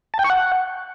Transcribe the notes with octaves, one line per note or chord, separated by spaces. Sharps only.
A5
G5
C#6
F#5